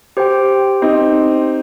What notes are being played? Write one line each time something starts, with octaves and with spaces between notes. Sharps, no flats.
G4 C5 G5
C4 D#4